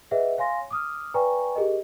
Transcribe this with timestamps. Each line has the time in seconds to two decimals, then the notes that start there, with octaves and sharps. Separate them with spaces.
0.11 G#4 B4 C#5 D#5 E5 F#5
0.38 C#5 F5 G#5 C6 A#6
0.71 D6 D#6 F6
1.14 B4 D5 G5 G#5 A#5 C#6
1.55 G4 G#4 A#4 D#5